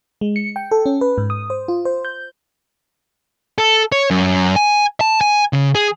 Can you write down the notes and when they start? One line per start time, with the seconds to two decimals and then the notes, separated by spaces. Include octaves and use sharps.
0.21 G#3
0.36 C#7
0.56 G5
0.71 A4
0.86 C#4
1.01 B4
1.18 G#2
1.30 D#6
1.50 C5
1.68 F4
1.85 C5
2.05 G6
3.58 A4
3.92 C#5
4.11 F#2
4.56 G#5
5.01 A5
5.21 G#5
5.53 C#3
5.75 G#4